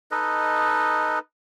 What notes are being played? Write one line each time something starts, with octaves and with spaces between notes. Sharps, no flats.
D#4 A4 B4 D#5